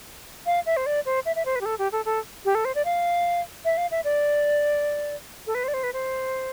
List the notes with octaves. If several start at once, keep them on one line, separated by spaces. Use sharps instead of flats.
F5
E5
C5
D5
C5
E5
E5
C5
B4
G4
A4
G4
A4
A4
G4
A4
C5
D5
F5
E5
F5
E5
D5
A4
B4
C5
D5
C5
B4
C5